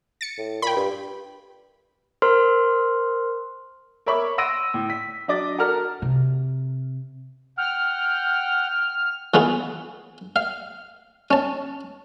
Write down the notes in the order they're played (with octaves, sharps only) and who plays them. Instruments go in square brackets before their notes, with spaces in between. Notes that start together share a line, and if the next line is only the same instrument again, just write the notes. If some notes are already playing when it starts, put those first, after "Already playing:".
[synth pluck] A6 C#7
[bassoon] A2
[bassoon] A#2 [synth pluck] G5 B5
[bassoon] G2
[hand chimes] A#4 C5 C6 F6
[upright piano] A#4 C#5 E5 B5 C#6 D6
F#5 C6 E6 A#6 D7 D#7
A2
B6
F#3 D4 D#5 D6 A6
F#4 A4 A#4 A5 A#5 F6
[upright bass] C3
[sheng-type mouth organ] F#5 G5 [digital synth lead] F6
[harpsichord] E3 B3 F4 G#4
F5
C#4 A5